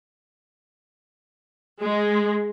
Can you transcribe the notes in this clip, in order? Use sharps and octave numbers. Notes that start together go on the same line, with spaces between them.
G#3